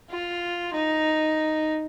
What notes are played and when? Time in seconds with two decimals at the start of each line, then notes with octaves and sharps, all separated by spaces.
0.10 F4
0.74 D#4